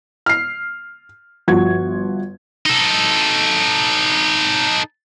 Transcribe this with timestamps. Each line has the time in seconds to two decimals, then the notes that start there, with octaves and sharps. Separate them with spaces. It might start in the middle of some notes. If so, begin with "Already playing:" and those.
0.26 F6 C7
1.47 G1 F3 F#4 G#6
2.66 D#4 A4